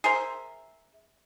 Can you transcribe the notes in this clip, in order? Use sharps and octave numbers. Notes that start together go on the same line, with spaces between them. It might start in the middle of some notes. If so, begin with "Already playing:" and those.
G#4 A#4 C5 E5